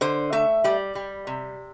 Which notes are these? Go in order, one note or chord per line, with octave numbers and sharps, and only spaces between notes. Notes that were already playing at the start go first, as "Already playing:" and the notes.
D3 C5
A3 E5
G3 D5
G3
C3